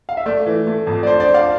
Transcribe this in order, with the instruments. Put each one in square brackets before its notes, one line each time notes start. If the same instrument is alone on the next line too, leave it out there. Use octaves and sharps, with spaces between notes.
[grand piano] F5
E5
[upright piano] A3 [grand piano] D5
[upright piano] E3
A3
F2
[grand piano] D5
[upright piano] D4 [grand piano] C5
[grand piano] D5
[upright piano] D4
[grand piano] D5 F5